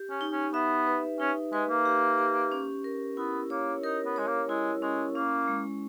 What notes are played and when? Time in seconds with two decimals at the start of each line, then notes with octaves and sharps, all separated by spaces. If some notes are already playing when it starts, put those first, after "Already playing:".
Already playing: G4
0.10 C#4
0.21 D#4
0.32 C#4
0.53 B3 E5
0.87 B4
1.20 C#4 D#4
1.52 G#3 B4
1.69 A#3
1.85 G4
2.18 G4
2.52 C#4
2.84 A#4
3.17 B3 E4
3.50 A#3 C#5
3.83 D#4 A#4
4.05 B3
4.16 G#3 C#5
4.27 A#3
4.49 G#3 E4
4.82 G#3 C#4
5.15 A#3 C#4
5.48 G#3